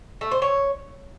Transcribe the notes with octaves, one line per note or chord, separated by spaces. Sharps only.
A3
C5
C#5